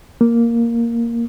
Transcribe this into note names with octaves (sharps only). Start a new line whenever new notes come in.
A#3